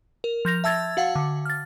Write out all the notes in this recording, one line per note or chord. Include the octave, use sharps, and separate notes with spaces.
A#4
F3 G6 A#6 F7
E5 A5 E6 G#6 A6
F#4 F5 F#5
D3
F6 A6